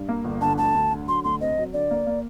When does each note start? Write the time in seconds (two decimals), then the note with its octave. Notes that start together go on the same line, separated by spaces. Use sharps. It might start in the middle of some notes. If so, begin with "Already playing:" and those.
Already playing: G2
0.09 A#3
0.24 G1
0.41 D3 A5
0.58 D2 A5
0.74 D2
0.91 D3
1.07 F#3 C6
1.24 D2 C6
1.41 C4 D#5
1.58 F#3
1.73 D3 D5
1.91 A#3
2.07 A#3